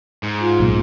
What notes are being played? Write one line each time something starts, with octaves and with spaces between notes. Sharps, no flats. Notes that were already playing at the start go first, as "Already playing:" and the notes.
G#2
F4
B1 A#2